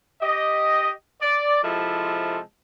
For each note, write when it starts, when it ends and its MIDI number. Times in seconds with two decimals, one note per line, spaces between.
0.22 0.91 67
0.22 0.91 75
1.21 1.61 74
1.64 2.39 48
1.64 2.39 53
1.64 2.39 56
1.64 2.39 64
1.64 2.39 69